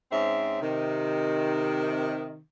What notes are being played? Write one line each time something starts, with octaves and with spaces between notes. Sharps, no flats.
G#2 C4 C#4 E5
C3 D#3